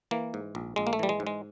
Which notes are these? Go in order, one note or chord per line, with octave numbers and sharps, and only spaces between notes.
E3 A#3
G#2
A#1
A#1 G#3
A#3
A3
E3 G3
G#3
G#2
G#3